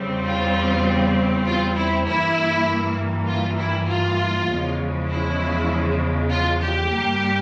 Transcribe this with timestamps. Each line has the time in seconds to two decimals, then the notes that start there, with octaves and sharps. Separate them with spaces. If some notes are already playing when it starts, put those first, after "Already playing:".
Already playing: E2 C#3 G3 C4
0.25 F4
1.45 F4
1.75 E4
2.05 G2 E3 A#3 E4
3.27 F4
3.57 E4
3.87 F4
4.48 E2 C#3 F3 G#3
5.08 E4
6.29 F4
6.60 G4
6.90 G2 G3 A#3